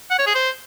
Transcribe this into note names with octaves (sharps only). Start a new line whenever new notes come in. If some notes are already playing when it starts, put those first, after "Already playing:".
F#5
C#5
G#4
C5